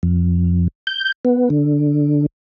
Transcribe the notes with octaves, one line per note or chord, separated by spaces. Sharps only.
F2
G6
B3
D3